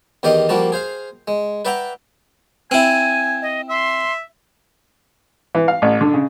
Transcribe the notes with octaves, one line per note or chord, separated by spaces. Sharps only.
E2 D#3 G4 D5 D#5 F5
F3 G3 A#3 F#4 A5
G#4 C5 F5
G#3
B4 D5 E5 F#5 G5 A#5
C4 E4 G#5 D#7
D#5
E5 C6
E3
F5
A1
D3
C#3